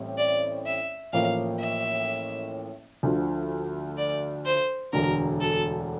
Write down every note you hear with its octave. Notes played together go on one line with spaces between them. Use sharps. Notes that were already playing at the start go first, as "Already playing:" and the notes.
Already playing: A1 A2 G3 C4
D5
E5
A1 A2 F3 A#3 F5
E5
D2 D3 F3
D5
C5
E1 D2 D3 A#4
A4